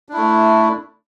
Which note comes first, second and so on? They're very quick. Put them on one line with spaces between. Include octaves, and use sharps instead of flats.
D4 E4 A3